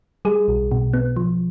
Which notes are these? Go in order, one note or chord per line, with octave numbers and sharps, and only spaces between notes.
G3 G#4
B1
B2
B3
F3